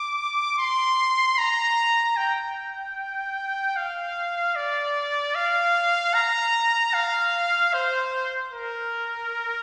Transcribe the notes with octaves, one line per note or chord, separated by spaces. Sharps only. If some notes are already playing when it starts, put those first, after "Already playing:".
Already playing: D6
C6
A#5
G5
F5
D5
F5
A#5
F5
C5
A#4